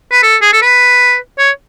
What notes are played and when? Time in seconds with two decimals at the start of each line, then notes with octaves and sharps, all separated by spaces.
0.12 B4
0.23 A4
0.42 G#4
0.53 A4
0.62 B4
1.39 C#5